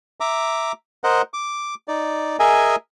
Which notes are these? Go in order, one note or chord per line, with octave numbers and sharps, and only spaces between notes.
E5 A#5 D6
A#4 C5 D#5 F#5
D6
D#4 D5
G#4 A#4 D#5 E5 G#5